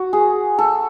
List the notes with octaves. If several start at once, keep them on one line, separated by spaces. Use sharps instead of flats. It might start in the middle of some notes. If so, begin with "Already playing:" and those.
Already playing: F#4
G#4
A4